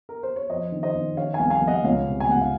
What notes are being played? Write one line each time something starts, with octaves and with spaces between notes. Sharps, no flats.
A#4
C5
C#5
F2 C5 D#5
D#3
C5 D#5
D#3
D#3 C#5 F5
F5 G#5
C2
F5 G#5
C2
D#5 F#5
C#2 C#5 F5
C3
G#5
C#2 F#5
F5